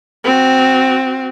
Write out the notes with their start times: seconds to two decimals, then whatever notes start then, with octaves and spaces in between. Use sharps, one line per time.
0.24 C4 F#4